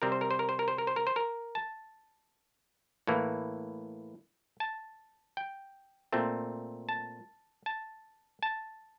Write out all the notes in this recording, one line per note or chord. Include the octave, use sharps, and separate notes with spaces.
C3 G3 C4 A#4
C5
A#4
C5
A#4
C5
A#4
C5
A#4
C5
A#4
C5
A#4
A5
A2 E3 A#3
A5
G5
A#2 A3 C4
A5
A5
A5